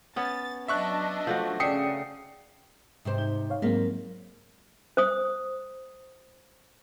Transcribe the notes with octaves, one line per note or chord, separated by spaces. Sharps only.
B3 C#4 A6
F#3 D4 D#5 E5 C#6 F#6
F3 A3 F#4
C#3 D5 E5 G5 D#6 C7 C#7
G#2 C3 C5
D#4
C#5 F5
G#2 F#3 G#3 A#3 C4 F4 A#4
C5 D#6